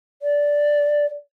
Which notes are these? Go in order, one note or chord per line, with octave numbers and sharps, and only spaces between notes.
D5